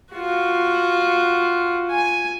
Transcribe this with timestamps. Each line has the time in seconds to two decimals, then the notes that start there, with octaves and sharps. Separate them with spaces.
0.14 F4 F#4
1.91 G#5